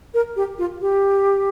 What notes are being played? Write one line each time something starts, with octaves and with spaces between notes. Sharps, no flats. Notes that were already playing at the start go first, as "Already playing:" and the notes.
A#4
G4
F4
G4